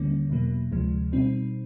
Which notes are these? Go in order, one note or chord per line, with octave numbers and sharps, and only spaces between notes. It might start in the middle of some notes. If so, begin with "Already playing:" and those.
Already playing: D#2 D3 G3 A#3 C#4
E2 B2 F#3 A#3
D2 C3 F3 G#3
B2 G3 C4 D#4